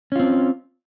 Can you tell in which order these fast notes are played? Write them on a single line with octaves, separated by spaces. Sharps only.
C#4 F4 C4